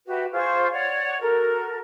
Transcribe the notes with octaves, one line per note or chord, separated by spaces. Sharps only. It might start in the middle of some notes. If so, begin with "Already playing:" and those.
F#4 G4 B4 E5
F4 G#4 C5 C#6
C#5 D5 F#5
F#4 A4 A#4